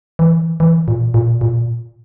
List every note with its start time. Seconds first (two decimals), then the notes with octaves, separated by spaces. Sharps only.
0.19 E3
0.60 E3
0.88 A#2
1.14 A#2
1.41 A#2